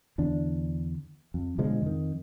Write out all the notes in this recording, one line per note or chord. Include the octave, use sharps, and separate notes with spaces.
E2 D3 D4
F2
B2 D3 F3 G#3
F2 D#3